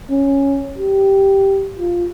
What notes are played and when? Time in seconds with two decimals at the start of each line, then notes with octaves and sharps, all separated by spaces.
0.10 C#4
0.78 G4
1.78 F4